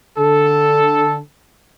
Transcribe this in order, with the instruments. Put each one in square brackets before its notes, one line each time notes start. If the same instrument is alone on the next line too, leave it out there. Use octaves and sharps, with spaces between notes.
[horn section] D3 A4